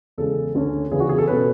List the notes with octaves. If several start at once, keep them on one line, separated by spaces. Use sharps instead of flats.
E2 C#3 G#3 A4
D2 D3 A3 C#4
E2 C#3 E3 G#4
F#4
G#4
A4
B2 A3 C#4 B4